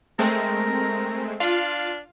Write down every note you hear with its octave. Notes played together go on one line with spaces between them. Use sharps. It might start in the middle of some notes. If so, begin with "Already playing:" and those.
G#3 A3 C4 A#4
D4 F4 F5